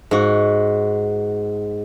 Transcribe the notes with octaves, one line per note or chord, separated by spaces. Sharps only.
G#2 F#4